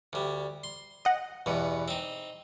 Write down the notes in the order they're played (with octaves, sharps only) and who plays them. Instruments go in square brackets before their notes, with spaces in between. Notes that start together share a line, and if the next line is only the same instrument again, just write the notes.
[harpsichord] D2 G3
C6
[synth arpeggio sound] D#5 F#5
[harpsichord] E2 G2 B2
C4 D#4